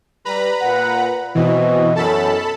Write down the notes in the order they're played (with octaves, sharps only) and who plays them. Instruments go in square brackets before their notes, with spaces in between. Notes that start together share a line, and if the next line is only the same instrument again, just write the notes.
[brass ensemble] G3 [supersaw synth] B4 A#5 B5
[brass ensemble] A#2 F#5
[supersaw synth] B2 E3 [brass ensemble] C4 F#4 D#5
[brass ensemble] F#2 [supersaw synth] A4 A5 B5